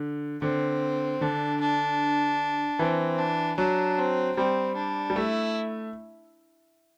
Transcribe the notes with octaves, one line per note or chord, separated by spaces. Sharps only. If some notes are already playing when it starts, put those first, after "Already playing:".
Already playing: D3
D3 C4
D3 D4
D4
E3 C4
D4
F#3 D4
C4
G3 C4
D4
G3
A3 E4